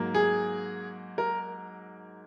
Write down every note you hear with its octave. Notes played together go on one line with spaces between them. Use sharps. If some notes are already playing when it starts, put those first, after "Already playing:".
Already playing: G#2 F#3 A#3
G#4
A#4